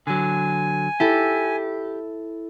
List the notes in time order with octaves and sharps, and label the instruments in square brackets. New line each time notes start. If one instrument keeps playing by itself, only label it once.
[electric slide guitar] D3 F#3 [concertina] G#5
[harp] E4 A4 [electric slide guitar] G4